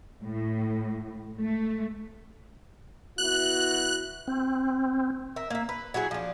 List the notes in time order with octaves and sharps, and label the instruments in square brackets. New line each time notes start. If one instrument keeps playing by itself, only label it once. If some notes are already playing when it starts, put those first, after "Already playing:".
[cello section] A2
A3
[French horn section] B3 E4 F#4 [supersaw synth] F#6
[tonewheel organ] C4
[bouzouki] A#4 E5
A#3 E5
B4
F#3 E4 F#4 G#4
F3 D4